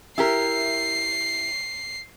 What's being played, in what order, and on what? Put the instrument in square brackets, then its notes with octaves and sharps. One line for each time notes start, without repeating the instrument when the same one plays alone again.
[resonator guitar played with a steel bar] E4 G4 A#4 [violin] C7